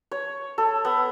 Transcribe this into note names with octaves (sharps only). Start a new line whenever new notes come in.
C#5
A4
B3